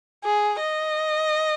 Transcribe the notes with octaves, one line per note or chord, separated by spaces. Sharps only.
G#4
D#5